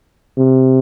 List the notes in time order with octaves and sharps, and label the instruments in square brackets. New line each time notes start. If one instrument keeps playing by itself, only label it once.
[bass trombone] C3